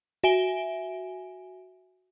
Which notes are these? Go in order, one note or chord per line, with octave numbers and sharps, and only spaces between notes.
F#4 E5 G#5 D7 G7